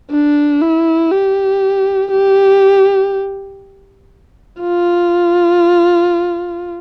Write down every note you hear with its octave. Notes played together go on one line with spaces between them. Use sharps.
D4
E4
G4
G4
F4